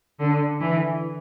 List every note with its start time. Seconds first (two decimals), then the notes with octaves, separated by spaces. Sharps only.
0.19 D3
0.60 E3